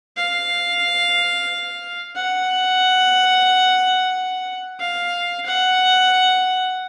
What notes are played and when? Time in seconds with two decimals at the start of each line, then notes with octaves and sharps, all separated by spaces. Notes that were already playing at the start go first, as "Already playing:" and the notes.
0.17 F5
2.16 F#5
4.80 F5
5.46 F#5